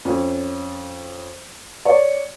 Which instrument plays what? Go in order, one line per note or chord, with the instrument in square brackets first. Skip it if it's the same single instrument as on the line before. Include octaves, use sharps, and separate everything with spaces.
[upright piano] F2 C#4
C#5 D5